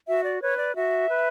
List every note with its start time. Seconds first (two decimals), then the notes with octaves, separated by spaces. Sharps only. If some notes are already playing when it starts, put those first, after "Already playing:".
0.07 F#4 E5
0.24 D5
0.41 B4 C#5
0.58 D5
0.75 F#4 E5
1.08 B4